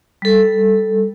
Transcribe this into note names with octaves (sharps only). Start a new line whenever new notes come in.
G3 A4